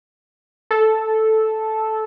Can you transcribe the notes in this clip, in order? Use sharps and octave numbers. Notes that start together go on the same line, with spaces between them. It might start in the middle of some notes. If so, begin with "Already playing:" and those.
A4